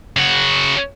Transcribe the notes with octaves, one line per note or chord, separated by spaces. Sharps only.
C#3 F#4